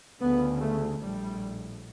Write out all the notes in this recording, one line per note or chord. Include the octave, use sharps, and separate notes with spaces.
D2 C#3 B3
A3
A#1 A2 G3